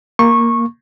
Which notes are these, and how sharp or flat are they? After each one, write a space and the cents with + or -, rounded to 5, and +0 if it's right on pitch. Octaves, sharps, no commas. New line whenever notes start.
A#3 +0 C#6 -15